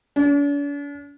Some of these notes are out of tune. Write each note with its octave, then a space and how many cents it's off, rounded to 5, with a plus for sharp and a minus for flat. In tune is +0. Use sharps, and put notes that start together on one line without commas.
D4 -45